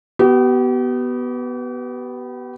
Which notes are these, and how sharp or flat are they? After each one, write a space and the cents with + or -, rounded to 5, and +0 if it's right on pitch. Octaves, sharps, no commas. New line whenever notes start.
B3 +0 G4 -40